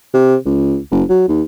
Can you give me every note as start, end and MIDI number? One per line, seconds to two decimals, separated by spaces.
0.13 0.36 48
0.45 0.78 37
0.91 1.03 30
1.09 1.25 54
1.28 1.42 39